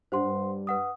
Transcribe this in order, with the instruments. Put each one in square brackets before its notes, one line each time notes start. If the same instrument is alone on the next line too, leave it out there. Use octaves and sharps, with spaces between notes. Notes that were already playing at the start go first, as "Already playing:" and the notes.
[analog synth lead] G2 [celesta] C5 F#5 C6
[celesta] B4 F#5 D#6